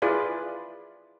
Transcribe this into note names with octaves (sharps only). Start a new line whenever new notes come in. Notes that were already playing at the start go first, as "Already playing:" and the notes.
E4 F4 G#4 B4 D5